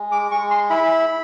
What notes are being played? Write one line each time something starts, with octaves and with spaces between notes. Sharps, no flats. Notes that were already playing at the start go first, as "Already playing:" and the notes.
Already playing: G#3
D6
G#3 C#6
C6
E4 B5